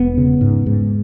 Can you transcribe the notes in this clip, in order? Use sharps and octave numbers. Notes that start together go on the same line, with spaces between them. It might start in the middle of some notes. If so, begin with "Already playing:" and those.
Already playing: E1 B3
C#3
G#2
G#2